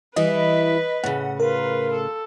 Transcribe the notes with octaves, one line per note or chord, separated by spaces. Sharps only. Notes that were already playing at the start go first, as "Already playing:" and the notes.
E3 G3 E4 B4 D#5 B5
A2 C#3 F#5
F4 A#4 B4
A4